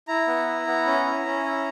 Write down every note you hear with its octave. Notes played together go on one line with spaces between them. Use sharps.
E4 A#5
B3
E4
B3
C#4
E4
C#4
E4